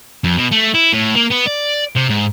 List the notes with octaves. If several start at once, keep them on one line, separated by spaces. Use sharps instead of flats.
F2
B2
A3
E4
A2
A#3
B3
D5
C3
G#2